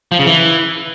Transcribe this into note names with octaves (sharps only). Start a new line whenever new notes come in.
F3
C#3
E3